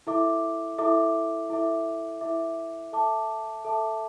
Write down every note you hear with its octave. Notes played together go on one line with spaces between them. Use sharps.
E4 A4 E5 D6
E4 A4 E5 D6
E4 A4 E5 D6
E4 A4 E5 D6
A4 E5 A5 D6
A4 E5 A5 D6